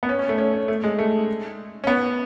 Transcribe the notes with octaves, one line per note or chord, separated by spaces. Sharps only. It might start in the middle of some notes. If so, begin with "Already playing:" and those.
B3
C#4
C#4
A3
C#4
C#4
A3
G#3
A3
C#4
B3